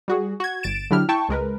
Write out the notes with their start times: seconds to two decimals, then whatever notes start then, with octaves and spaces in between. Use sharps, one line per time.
0.08 G3 F#4 G#4
0.40 F#4 G#6
0.63 G1 A6 D7 E7
0.90 D3 F#3 D4 E4 G4 F6
1.09 E4 G5 A5 C#6
1.29 C#2 G#3 A#4 B4